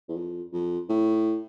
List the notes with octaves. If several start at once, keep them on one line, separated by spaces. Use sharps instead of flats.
E2
F2
F2
A2